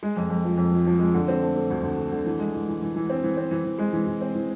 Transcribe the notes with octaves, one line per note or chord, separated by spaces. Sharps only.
G#3
F2
F2
F3
F2
F3
F3
G#3
D3
C4
A3
A3
D2
D2
A3
D3
E3
G#3
E3
E3
E3
E3
C4
E3
C4
E3
E3
G#3
E3
E3
C4
E3